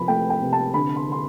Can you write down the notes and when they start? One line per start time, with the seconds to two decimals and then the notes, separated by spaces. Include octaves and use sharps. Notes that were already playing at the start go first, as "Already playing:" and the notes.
Already playing: C3 F3 B5
0.08 A3 G5
0.30 G5
0.41 C3
0.53 A5
0.74 D3 B5
0.96 C6
1.07 D3 C6